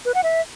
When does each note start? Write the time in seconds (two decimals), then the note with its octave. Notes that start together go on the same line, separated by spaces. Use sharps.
0.05 B4
0.14 F#5
0.24 E5